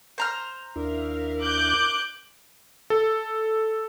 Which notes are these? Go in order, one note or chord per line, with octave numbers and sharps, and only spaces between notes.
C5 A#5 F6
D#2 D4 E4 A#4 E5 F5
D6 F#6 G6
A4